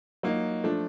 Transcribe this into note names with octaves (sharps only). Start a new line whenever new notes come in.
F#3 A#3 D#4
F3 A3 D4